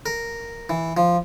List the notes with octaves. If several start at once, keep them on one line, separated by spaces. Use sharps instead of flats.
A#4
E3
F3